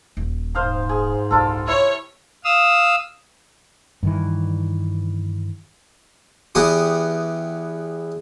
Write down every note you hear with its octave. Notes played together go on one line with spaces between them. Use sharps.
D#1
G#2 C5 F5 D#6
G#4
D#1 C2 G3 F4 A4
E4 C#5
F5 D#6 E6
G2 D#3 E3
E2 B3 G4 D#6